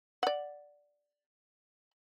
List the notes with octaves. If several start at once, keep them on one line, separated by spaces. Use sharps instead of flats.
D5 F#5